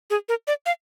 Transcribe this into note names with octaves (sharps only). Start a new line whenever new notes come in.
G#4
A#4
D5
F5